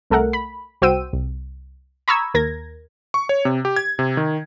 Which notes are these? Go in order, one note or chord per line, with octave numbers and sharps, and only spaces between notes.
C2 A3 A4 A#4 F#5
B5
C2 F#4 C5 G5 E6 D#7
C2
A#5 B5 C#6 D#6 E6 G#6
D#2 A#4 G#6 A#6
C#6
C#5
C3
G4
G#6
C3
D#3